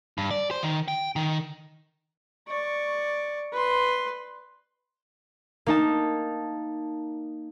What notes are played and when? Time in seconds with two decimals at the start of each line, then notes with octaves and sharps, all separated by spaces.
0.18 G2
0.31 D5
0.51 C5
0.63 D#3
0.88 G5
1.16 D#3
2.48 D5 C#6
3.53 B4 C6
5.66 A#3 D#4 A5